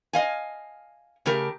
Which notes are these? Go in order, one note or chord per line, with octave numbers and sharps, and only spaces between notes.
D#5 F5 G#5
C#3 A3 G4 A#4